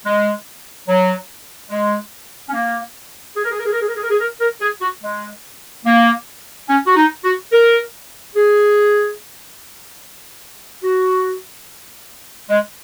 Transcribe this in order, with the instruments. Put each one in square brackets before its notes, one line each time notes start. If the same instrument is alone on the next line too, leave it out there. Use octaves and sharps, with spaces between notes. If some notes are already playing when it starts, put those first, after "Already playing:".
[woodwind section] G#3
F#3
G#3
C#4
A#3
G#4
A#4
G#4
A#4
G#4
A#4
G#4
A#4
G#4
A#4
G#4
A#4
A#4
G#4
F#4
G#3
A#3
C#4
F#4
D#4
F#4
A#4
G#4
F#4
G#3